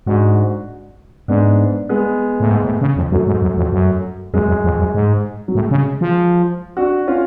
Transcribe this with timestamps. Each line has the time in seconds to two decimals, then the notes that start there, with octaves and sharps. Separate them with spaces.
0.07 G#2 D4 F#4
1.28 G#2 B3 D4
1.89 G#3 B3
2.40 A2
2.51 G#2
2.65 A2
2.81 C#3
2.97 F2
3.11 F#2 F#3 A3
3.27 G#2
3.42 F#2
3.57 F2
3.73 F#2
4.34 F#2 G#3
4.48 F#2
4.64 F2
4.79 F#2
4.95 G#2
5.48 F#3
5.55 A2 G#3
5.71 C#3
6.01 F3
6.77 D4 F#4
7.08 C#4 F4